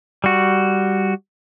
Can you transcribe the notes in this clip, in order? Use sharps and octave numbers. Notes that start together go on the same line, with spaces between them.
G3 F#4